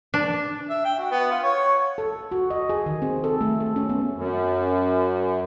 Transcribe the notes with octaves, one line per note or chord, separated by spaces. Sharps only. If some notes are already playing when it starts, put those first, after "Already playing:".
D4
E5
G5
F#4
B3
F4
C#5
A4
F#4
D#5
G#4
D#3
C4
A4
A3
A4
C#4
B3
F#2